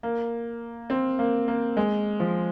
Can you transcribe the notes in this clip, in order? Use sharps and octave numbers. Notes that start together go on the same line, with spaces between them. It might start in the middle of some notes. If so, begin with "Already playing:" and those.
A#3
C4
A#3
A#3
G#3
F3